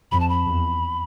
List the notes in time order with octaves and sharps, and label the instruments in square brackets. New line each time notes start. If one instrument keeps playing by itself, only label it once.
[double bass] F2 [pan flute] B5
[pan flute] A5
B5
[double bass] E2